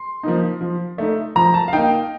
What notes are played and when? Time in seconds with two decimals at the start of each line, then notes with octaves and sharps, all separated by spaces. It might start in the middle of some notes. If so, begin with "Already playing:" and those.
Already playing: C6
0.23 F3 A#3 D#4
0.61 F3
0.98 A3 D#4
1.35 F3 A#5
1.54 A5
1.68 F5
1.73 A#3 D#4 G5